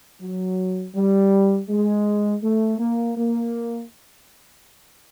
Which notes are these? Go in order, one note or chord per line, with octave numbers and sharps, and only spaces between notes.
F#3
G3
G#3
A3
A#3
A#3